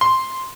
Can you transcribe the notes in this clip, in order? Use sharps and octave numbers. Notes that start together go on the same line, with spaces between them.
C6